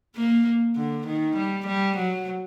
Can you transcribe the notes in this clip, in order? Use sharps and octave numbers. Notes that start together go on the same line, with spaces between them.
A#3
D3
D#3
G3
G3
F#3